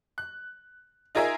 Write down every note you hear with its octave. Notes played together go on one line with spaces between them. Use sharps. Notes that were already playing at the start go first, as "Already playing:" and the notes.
F#6
D#4 F4 G#4 A#4 E5 G#5